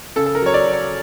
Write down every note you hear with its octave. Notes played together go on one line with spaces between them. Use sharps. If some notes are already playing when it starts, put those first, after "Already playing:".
C#3 A4
A4
A#4
F#3 C#5
D5
F#3
C#5